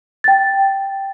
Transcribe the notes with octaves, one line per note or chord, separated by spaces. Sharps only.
G5 A6